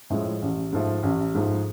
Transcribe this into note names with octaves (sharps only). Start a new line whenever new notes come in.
A2 F3 G#3
A1
G#2 F3 A3
A1
G#2 F3 A3